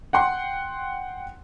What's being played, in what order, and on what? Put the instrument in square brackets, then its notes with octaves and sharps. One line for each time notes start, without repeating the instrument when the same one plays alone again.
[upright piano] F#5 G5 C6